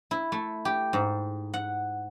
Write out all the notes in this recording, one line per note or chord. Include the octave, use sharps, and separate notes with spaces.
E4
A3
G4
G#2
F#5